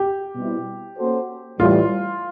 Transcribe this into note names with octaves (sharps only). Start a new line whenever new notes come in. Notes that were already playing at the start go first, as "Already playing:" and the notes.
Already playing: G4
B2 G3 C4 E4
A#3 C#4 F#4 A4 C5
A2 E3 G3 F4